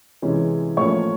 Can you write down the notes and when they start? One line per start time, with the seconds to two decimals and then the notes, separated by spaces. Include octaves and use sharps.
0.22 C3 E3 G#3 C#4
0.76 A2 F3 A#3 C#4 C#5 C#6